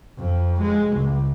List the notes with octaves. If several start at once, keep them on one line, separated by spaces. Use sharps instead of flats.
F2
G#3
C#2